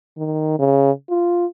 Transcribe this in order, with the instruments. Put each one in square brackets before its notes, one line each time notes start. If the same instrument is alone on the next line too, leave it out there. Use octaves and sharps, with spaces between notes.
[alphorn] D#3
C#3
F4